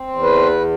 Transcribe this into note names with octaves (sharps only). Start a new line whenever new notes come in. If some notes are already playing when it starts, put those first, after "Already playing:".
Already playing: C4
E2
B4